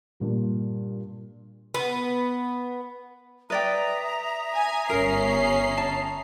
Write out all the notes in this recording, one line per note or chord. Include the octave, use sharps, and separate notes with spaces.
G2 A#2 G3
B3
B4 D5 E5 G5 A#5 D#6
G#5
G1 C#4 A#4 C7
A5